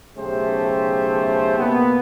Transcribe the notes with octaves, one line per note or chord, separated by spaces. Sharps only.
B1 C#3 A3 G4 C5
B2 A#3 B3